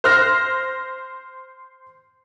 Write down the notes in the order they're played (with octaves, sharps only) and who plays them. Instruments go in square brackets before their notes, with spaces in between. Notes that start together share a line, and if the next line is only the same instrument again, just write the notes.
[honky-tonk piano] C5 F6 A#6